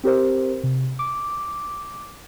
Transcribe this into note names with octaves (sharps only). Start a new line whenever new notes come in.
C4 G4 A#4 C5
C3
D6